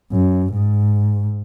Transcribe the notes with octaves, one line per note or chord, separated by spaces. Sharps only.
F#2
G#2